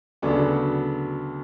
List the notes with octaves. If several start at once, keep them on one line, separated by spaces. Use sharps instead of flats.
D2 C#3 F#3 B3 D4